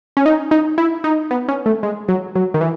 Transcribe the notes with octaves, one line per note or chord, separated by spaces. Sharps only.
C#4
D#4
D#4
E4
D#4
B3
C#4
A3
G#3
F#3
F#3
D#3
E3